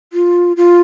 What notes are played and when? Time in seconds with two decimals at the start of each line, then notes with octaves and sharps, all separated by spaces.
0.13 F4
0.57 F4